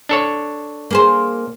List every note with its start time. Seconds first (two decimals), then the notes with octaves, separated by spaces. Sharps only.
0.09 D4 A4 C#5
0.91 A#3 G#4 C5